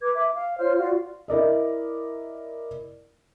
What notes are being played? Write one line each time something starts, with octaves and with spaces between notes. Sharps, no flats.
B4 D6 G#6
E5 D6
F5
F4 C5 C#5 F6
F4 F#4 D5 F5
E4 A#4 D5 D#5